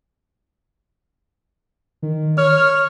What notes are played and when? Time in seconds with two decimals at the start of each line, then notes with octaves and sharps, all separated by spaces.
2.03 D#3
2.38 C#5 F6